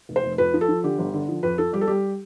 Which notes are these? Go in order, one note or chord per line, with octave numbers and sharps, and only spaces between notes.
F1
C5
F1
F2 B4
F3
A4
F3
D3 G4
G1
D3
F3
F2 B4
F3 A4
G3 G4
A4
G3 G4